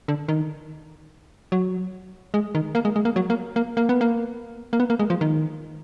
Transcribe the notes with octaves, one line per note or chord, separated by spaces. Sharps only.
D3
D#3
F#3
G#3
D#3
A#3
G#3
G#3
A#3
F#3
A#3
A#3
A#3
B3
A#3
A#3
B3
A#3
G#3
F3
D#3